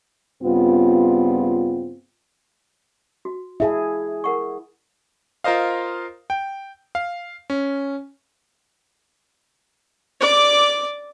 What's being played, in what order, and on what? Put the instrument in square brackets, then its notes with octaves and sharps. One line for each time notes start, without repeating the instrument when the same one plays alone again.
[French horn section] G2 C#3 B3 C4 F4
[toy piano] F#4
[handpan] E4 G#4 [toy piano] E5 F5 A5
[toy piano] A#4 F#5 C#6
[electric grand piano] F4 A#4 C5 D#5 F5
G5
F5
C#4
[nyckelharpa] D5 D6